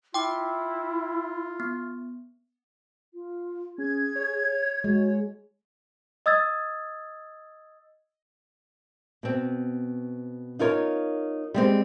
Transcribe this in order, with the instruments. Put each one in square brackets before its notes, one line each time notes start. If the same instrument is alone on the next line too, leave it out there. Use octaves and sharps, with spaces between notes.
[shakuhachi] E4 [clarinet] F4 [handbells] G5 D6
[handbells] B3
[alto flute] F4
[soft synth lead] C#4 [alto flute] G#4 [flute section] G#6
[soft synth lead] C#5
[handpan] G#3 [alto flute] F#4
[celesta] D#5 D#6 E6 G#6 A6
[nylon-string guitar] B2 C4
D#4 F4 A#4 C#5
G3 G#3 C4